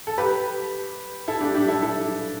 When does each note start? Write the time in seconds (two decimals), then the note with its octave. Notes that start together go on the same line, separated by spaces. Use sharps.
0.07 A4
0.18 G4 B4
1.28 E4 A4
1.41 D4 G4
1.54 D4 G4
1.68 E4 A4
1.82 E4 A4